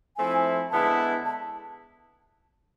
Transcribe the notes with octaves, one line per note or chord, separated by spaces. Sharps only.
F3 A3 C4 E4 G#5
D3 G#3 B3 E4 A5
A5